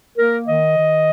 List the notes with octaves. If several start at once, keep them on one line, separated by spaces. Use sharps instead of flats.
A#3 A#4
D#3 D#5
D#3